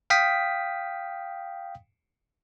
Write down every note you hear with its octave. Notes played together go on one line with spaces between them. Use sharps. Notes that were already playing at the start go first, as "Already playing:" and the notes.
F5 G5 D#6 B6